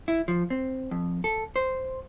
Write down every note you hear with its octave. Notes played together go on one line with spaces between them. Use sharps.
E4
F3
C4
F2
A4
C5